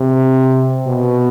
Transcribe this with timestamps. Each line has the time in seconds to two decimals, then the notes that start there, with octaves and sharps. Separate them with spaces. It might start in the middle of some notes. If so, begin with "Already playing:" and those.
Already playing: C3
0.87 B2